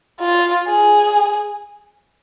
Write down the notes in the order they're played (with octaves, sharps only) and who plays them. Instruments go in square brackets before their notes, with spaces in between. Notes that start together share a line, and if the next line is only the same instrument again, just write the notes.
[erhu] F4
G#4